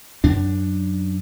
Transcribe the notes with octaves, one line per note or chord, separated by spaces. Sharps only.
F#2 D4